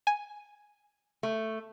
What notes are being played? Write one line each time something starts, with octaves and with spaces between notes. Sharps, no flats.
G#5
A3